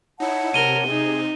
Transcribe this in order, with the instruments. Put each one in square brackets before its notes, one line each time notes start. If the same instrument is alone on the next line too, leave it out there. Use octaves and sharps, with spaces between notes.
[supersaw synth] D#4 E4 [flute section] C#5 F#5 A5
[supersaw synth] C3 [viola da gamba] A#4 [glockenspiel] D#7 G7
[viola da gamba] D#4 [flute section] G#4